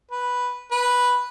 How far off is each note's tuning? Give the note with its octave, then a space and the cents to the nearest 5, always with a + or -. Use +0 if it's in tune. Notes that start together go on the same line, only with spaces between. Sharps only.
B4 -5
B4 -5